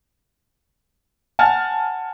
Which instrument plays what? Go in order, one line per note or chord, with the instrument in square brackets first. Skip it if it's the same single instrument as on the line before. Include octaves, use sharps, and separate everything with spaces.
[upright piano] F#5 G#5 A5 F6 A6